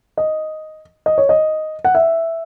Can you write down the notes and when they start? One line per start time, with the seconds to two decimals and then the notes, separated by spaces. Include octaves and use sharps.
0.17 D#5
1.06 D#5
1.18 C#5
1.29 D#5
1.85 F#5
1.95 E5